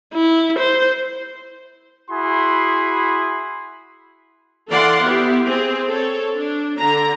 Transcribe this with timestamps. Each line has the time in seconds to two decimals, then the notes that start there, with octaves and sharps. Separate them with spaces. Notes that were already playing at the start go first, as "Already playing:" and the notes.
0.14 E4
0.58 C5
2.11 E4 F#4 G#4 B5 C6
4.69 E3 A4 D5 F5 F#5 C6
5.02 B3 E4 G4
5.44 C4 G#4
5.89 A4 C#5
6.37 D4
6.79 D3 A#5